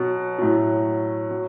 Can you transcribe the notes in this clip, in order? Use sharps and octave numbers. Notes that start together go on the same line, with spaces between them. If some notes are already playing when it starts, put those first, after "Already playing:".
Already playing: B2 F#3
A2 F#3
F#3